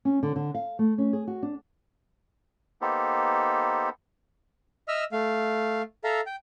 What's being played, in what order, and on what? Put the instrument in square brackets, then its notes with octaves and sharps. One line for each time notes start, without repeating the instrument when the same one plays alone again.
[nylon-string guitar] C#4
D3
D3
F5
A3
C#4
G#4
F#4
D4
[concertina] A#3 B3 D#4 G4 A4 C5
[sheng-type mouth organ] D#5 E5 E6 F6
A3 F5
A4 E5 F5 A#5
G5